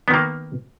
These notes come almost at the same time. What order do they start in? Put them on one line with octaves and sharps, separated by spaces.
B3 D#3 A#3